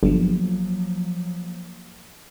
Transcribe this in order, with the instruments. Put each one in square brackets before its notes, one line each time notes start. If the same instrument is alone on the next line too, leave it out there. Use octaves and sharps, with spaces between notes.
[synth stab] G1 [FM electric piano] F3 F#3 A#3